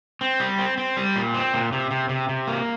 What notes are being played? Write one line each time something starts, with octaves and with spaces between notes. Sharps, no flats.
C4
G3
C4
C4
G3
A#2
C4
A#2
C3
C3
C3
C3
A#3